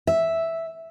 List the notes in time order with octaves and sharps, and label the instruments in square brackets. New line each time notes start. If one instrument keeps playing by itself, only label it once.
[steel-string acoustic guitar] E5